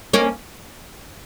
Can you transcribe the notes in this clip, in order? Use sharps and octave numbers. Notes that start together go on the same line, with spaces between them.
A#3 C#4